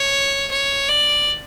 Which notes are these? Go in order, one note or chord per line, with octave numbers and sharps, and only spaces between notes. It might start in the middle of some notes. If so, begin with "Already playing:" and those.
Already playing: C#5
C#5
D5